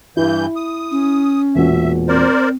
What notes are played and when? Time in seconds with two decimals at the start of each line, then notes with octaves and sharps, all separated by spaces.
0.17 G2 E3 E4 G6
0.56 D#6
0.91 C#4
1.55 E1 A#2 F#4 E5
2.08 C4 A#4 C5 D5